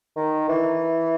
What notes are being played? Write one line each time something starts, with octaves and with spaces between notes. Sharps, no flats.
D#3
E3